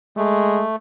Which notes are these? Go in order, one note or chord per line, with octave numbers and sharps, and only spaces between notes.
G#3 A3